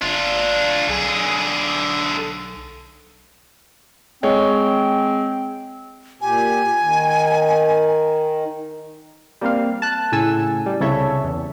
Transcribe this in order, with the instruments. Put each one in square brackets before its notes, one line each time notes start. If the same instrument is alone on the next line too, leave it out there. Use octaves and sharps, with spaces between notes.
[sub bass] G1 [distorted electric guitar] D4 F4
[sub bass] B1 [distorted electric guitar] D3 G#4
[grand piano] G#3 C#5 [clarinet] C4
[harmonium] A#2 G4 [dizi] G#5
[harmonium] D#3
[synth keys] G3 A#3 C4 F5
A5 F#6
A2 C#3 A4 G#5 E6
G3
C2 C#3 A4 C#5 E5
E2